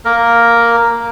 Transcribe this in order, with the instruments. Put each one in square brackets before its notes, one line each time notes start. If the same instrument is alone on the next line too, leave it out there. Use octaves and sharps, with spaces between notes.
[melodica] A#3 A#4